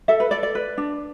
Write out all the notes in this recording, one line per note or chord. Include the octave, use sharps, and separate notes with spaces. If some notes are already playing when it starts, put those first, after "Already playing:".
A4 E5
B4
A4 D5
D5
B4
D4